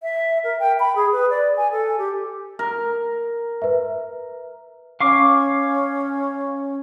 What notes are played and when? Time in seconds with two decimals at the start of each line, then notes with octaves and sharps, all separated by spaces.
0.03 E5
0.44 A#4
0.60 G5
0.80 B5
0.96 G#4
1.12 B4
1.30 D5
1.57 G#5
1.72 A4
1.98 G4
2.59 A#4
3.62 B4 E5
5.00 C#4 F5 C#6 D6